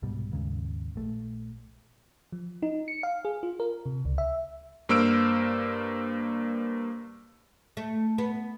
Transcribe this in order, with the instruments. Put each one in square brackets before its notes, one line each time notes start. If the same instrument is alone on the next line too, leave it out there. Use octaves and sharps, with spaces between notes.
[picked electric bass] C2 G#2 B2 G3
D#2 G#2 C#3
A#1 A3
[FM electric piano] F3
D#4
C#7
F5
G#4
F4
A#4
C3
C#2
E5
[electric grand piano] G2 A#3 C5 E6 F6 D7
[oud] A3
B3